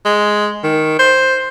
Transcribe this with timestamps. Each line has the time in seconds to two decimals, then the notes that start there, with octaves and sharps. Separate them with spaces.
0.05 G#3
0.63 D#3
0.99 C5